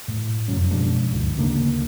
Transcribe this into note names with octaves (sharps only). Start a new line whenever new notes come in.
A2
F1 F#2 C#4
B2 F3 G#3 D4
G1 D2
D2 C#3 A#3 D4